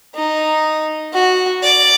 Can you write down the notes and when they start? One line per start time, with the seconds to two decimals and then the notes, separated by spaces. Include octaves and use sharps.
0.15 D#4
1.14 F#4
1.63 D5